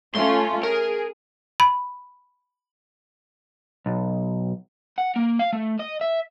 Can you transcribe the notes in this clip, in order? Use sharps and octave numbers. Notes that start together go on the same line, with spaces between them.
A3 C#4 F4 C6
G#4 A#4
B5
B1
F#5
A#3
F5
A3
D#5
E5